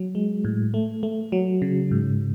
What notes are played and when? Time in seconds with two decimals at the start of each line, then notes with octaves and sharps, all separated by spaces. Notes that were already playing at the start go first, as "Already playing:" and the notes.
Already playing: F#3
0.15 G#3
0.45 A2
0.74 A3
1.03 A3
1.32 F#3
1.62 C#3
1.91 G#2